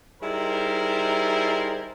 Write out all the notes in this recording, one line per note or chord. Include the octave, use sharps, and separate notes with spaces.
G3 D#4 E4 G#4 A#4 C5